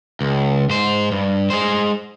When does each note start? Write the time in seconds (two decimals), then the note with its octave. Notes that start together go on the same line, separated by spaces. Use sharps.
0.21 C#2
0.69 G#2 C5
1.12 G2
1.50 G#3 C5